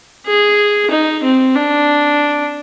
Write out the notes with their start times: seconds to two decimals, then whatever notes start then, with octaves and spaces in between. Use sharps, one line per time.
0.26 G#4
0.90 D#4
1.23 C4
1.56 D4